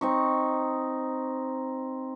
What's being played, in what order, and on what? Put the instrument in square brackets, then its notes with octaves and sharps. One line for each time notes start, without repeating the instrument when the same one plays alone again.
[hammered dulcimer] C4 D#4 C#6